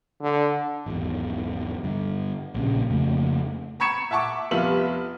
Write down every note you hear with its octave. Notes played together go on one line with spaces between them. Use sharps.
D3
G#1 E2
G2 D3
A#1 A#2 C#3
F2 C#3 A3 A#3
A#5 B5 C#6 G#6 C#7 E7
E5 F#5 A5 C#6 D6
F1 C2 B3 F4 E5 F#7